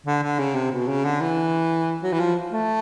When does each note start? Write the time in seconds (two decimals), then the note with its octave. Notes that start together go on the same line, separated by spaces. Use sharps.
0.06 D3
0.23 D3
0.39 C#3
0.55 C3
0.72 B2
0.88 C#3
1.05 D3
1.21 E3
2.03 F#3
2.13 E3
2.20 F3
2.52 A3